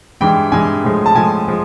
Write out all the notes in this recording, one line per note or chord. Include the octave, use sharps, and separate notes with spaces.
G2 E3 G#3 G5
G2 E3 G#3 G#5
A2 F3 G#3
A5
A2 F3 G#3 G#5
F3 G#3